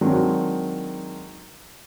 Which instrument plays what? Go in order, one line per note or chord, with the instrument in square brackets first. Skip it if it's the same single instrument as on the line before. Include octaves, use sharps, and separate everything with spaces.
[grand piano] D#3 F#3 G#3 C4 D4